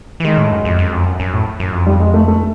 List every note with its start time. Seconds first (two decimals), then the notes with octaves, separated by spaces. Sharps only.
0.20 E3
0.25 D#3 G#3
0.38 A2
0.51 F#2
0.65 F2
0.79 F#2
0.92 F2
1.05 F#2
1.20 F#2
1.33 A2
1.60 F#2
1.73 F2
1.86 G3
2.00 G#3
2.14 A3
2.28 A3